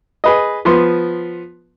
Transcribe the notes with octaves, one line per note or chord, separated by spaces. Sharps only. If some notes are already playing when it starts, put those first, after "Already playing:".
G#4 B4 D#5
F3 B3 C6